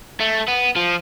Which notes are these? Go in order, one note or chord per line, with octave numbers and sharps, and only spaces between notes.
A3
B3
F3